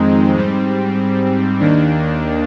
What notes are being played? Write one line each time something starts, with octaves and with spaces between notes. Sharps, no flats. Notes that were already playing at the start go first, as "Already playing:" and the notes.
Already playing: F2 D#3 G#3 C4 D#4
G#2 G3 C4
D#2 D#3 A#3 D4